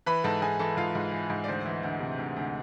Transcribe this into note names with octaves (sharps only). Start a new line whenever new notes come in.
E3 B4 B5
G#2 A4 A5
G#2 G#4 G#5
E3 A4 A5
G#2 F4 F5
G#2
E3
G#2
D5
D2 C5
E3
D2
C3
D2
D2